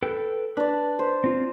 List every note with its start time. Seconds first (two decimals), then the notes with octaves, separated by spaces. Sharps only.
0.03 A4 B4 G5
0.57 D4 B4 D5
0.99 C5
1.24 C4 F4